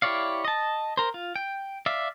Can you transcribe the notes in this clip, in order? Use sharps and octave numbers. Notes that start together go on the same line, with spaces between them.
E4 G4 C#5 D5 F5
D#5 A5
A#4 C5
F4
G5
D5 E5 F5